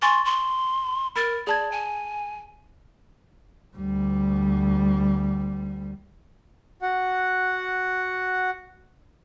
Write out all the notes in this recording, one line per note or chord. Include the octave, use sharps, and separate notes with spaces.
G#5 C6 C#6 A6
C6
A#4 B5 A6
G#4 D5 A5 G#6
G#5
D2 G3
F#4 F#5